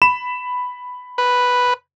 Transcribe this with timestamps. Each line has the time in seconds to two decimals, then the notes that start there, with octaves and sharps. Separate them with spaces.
0.02 B5 E7
1.18 B4